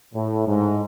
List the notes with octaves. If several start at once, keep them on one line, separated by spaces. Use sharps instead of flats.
A2
G#2